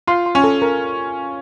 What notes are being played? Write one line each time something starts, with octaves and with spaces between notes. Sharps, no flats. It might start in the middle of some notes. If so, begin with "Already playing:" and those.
F4 C6
C6
C#4
A4
A#4